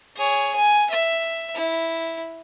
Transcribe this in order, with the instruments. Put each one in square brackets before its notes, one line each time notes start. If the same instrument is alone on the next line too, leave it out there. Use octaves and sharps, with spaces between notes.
[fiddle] G#4 C#5
G#5
E5
E4